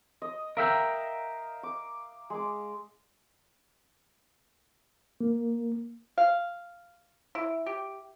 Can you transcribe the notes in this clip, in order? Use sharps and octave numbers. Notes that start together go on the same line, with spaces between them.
D#5
A#4 E5 F5 G5 A#5
D6
G#3 D6
A#3
F5
E4
G4